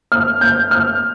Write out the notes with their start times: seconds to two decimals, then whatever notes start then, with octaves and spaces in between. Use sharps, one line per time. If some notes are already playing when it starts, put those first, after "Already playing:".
0.12 F6
0.41 G6
0.71 F6